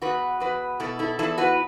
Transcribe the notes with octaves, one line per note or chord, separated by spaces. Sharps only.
E2 F#4 B4
E2 F#4 B4
B2 E4 A4
E4 A4
E2 E4 A4
F#4 B4